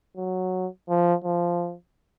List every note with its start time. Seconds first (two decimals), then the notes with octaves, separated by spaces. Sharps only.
0.17 F#3
0.89 F3
1.24 F3